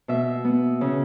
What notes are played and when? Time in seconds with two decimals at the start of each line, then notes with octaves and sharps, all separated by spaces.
0.08 B2 E5
0.44 B3
0.81 C#3